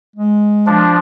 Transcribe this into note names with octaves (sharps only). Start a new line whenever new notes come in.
G#3
F3 D4